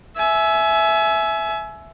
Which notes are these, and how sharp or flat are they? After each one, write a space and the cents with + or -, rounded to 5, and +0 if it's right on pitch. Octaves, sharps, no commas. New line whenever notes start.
E5 +0 G#5 +30